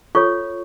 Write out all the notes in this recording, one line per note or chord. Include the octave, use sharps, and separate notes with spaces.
F4 A4 C#5 C#6